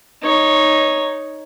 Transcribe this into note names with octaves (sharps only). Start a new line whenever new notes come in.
D#4 C#5